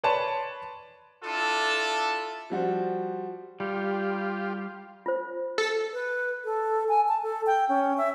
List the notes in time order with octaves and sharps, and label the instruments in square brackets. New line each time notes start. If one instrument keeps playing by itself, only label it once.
[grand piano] B4 C#5 D5 A5 C6
[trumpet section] D4 E4 F4 A4
[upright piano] F3 G3 F#4 C5
[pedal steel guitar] G3 [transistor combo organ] F4 G4
[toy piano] F4 C5
[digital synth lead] A4
[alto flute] B4
A4
G#5
A5
A4
G5
C#4
E5